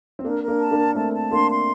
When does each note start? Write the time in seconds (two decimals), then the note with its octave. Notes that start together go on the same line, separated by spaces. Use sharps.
0.19 C4
0.24 A#3 D4 A#4
0.42 A#4
0.48 A#3 D4
0.60 A5
0.71 A#3 D4
0.78 A#4
0.95 A3 C4 A5
1.13 A5
1.31 A#3 D4 C6
1.49 C6